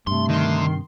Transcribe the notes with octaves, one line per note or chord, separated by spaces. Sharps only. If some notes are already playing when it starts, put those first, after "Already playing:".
G2 C3 A3 C6
D3 D#3 C6